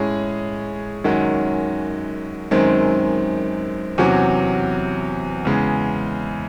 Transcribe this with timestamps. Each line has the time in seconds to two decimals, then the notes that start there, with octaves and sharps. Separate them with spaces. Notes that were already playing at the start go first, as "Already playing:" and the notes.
Already playing: A2 G#3 C#4 G#4
1.04 F#2 D#3 G#3 C#4 F#4
2.51 F#2 D#3 G#3 C4
3.98 E2 C3 F#3 C#4 F#4
5.45 E2 C#3 G#3